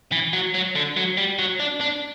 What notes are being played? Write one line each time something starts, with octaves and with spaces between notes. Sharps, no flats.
E3
F#3
F#3
D3
F#3
G3
F#3
D4
D4